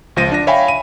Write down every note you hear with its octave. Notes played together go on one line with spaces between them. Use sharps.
C#2 F3 A#6 D#7
D4 A#6
C#5 E5 F5 G5 G#5 B5
D#7